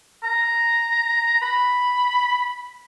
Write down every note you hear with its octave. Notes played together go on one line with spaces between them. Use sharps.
A#5
B5